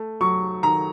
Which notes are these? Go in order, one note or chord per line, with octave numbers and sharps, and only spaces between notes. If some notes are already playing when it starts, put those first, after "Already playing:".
Already playing: A3
F#3 C#6
D#3 A#5